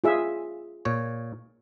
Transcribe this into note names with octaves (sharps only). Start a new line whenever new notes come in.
F4 G#4 E5
A#2 C#5